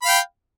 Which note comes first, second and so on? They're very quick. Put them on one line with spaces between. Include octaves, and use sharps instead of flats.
B5 F5 G5